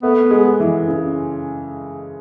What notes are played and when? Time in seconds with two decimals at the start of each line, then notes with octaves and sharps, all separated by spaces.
0.03 A3 B3
0.31 G#3
0.60 E3
0.88 C#3